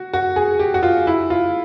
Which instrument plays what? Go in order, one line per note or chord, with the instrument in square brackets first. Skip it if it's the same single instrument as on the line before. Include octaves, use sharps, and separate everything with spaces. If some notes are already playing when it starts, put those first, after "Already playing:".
Already playing: [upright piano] F#4
F#4
G#4
G4
F#4
F4
E4
F4